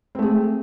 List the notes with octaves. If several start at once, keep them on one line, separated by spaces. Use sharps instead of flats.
A3 C4 G#4